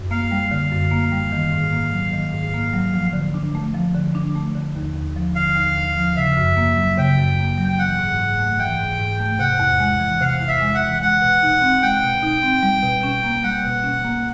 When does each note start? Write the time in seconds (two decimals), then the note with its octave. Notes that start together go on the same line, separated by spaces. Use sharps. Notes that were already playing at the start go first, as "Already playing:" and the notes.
Already playing: F#2
0.11 A#3 F5
0.31 G3
0.51 D3 F5
0.71 F#2
0.92 A#3
1.12 G3
1.32 D#3
1.52 G#2
1.72 A#3
1.92 F#3
2.13 D#3
2.33 G#2
2.54 A#3
2.73 F#3
2.94 F3
3.13 D3
3.34 D4
3.55 A3
3.74 F3
3.95 D3
4.15 D4
4.36 A3
4.55 D3
4.76 D#2
4.96 D#2
5.16 F3
5.35 D3 F5
5.56 D#2
5.77 D#2
5.97 F3
6.16 C#3 E5
6.37 F#2
6.57 A#3
6.77 F#3
6.97 C#3 G5
7.18 F#2
7.38 A#3
7.58 F#3
7.69 G5
7.78 E3 F#5
7.99 G#2
8.19 G#2
8.39 A3
8.59 E3 G5
8.79 G#2
8.99 G#2
9.20 A3
9.39 C3 F#5
9.59 E2
9.80 G#3
10.00 E3
10.21 C3 F5
10.41 E2
10.48 E5
10.61 G#3
10.75 F#5
10.81 E3
11.01 G#3 F#5
11.22 B2
11.42 D#4
11.61 C4
11.82 G#3 G5
12.03 B2
12.23 D#4
12.42 C4
12.63 G3
12.83 B2
13.03 C#4
13.24 A#3
13.44 G3 F#5
13.64 B2
13.84 C#4
14.04 A#3